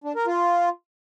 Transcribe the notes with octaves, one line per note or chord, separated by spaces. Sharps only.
D4
A#4
F4